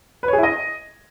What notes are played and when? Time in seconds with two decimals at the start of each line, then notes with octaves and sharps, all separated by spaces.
0.23 B4
0.28 C#5
0.33 G#4
0.38 E4
0.43 D#5